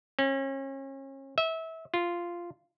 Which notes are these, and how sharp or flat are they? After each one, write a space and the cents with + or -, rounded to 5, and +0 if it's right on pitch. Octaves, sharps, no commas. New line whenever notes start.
C#4 -35
E5 -25
F4 -10